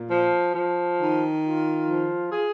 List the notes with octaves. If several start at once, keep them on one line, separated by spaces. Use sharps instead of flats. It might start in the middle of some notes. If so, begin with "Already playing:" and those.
Already playing: A#2
F3
F3
D#3
F4
F3
G#4